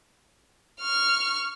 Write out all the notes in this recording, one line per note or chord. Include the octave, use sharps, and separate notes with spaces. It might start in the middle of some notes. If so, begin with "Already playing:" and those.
C#6 F6